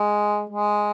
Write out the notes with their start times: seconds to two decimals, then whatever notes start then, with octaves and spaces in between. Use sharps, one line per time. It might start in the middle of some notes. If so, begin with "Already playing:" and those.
Already playing: G#3
0.50 G#3